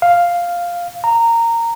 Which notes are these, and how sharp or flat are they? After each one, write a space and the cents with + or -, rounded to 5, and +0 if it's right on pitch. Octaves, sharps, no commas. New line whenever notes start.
F5 +0
A#5 -15